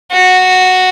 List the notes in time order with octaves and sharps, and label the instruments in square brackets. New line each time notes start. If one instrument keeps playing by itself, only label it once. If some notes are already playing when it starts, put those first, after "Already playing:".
[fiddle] F#4